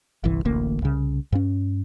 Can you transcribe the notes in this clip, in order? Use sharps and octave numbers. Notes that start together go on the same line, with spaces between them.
G1 C2 E3
D1 A1 D2 A#3
C2 C#3
G2 C#4